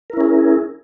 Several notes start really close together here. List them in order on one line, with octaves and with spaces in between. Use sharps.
A#4 E4 C#4 G#4